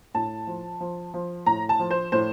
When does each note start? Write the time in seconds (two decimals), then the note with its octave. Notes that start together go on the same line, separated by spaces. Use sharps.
0.14 A2 A5
0.47 F3
0.80 F3
1.14 F3
1.46 A2 A#5
1.69 A5
1.79 F3
1.91 C5
2.12 A2 C5